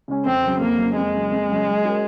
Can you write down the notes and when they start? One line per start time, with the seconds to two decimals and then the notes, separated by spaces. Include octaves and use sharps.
0.08 C#3 G#3 C#4
0.25 F2 C4
0.42 C#3 F#3
0.60 F2 A#3
0.78 C#3 F#3
0.96 F2 G#3
1.13 C#3 F#3
1.31 F2
1.49 C#3 F#3
1.66 F#3
1.83 C#4 F#4 A#4